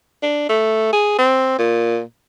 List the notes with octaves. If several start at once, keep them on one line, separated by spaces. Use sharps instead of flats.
D4
A3
G#4
C4
A#2